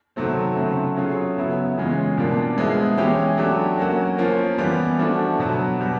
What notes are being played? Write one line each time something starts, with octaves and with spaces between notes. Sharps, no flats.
C3 D#3 F#3 A3 C4
C#3 F#3 A3 C4
F#3 A3 C#4 F4 G#4
C#3 F#3 B3 E4
C#3 E3 G#3 C#4 F4
B2 G3 A#3 D4 F4
F3 G#3 B3 E4 G#4
E3 G#3 C#4 E4 G4
F#3 A3 D4 G4
F#3 A#3 C#4 F#4
F3 A#3 C#4 F4
E3 G3 B3
F3 A3 D4 F#4
B2 F#3 B3
B2 G3 B3